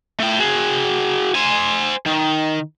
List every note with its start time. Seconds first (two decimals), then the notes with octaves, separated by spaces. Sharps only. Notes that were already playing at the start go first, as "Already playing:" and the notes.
0.19 A3 G5
0.39 F#4 G#4
1.35 C5 G#5
2.06 D#3